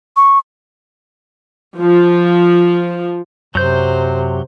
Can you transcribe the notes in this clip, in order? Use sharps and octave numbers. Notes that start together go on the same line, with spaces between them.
C#6
F3
F#2 C3 F#3 C5 G6